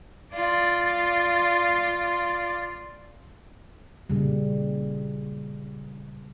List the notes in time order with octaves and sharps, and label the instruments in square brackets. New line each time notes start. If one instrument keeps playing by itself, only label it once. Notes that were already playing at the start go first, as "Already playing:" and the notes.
[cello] F4 D5
[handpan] A#2 C#3 G3